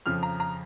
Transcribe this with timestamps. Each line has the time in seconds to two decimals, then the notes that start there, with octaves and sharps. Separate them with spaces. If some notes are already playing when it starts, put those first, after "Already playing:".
0.06 F2 C#3 F3 F6
0.23 A#5
0.40 A#5